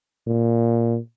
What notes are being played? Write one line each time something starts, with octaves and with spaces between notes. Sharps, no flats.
A#2